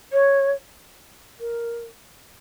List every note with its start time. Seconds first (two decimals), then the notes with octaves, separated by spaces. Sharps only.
0.12 C#5
1.39 A#4